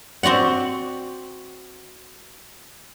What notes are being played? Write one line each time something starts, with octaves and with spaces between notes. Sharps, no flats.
C4 F#4 D5 F#5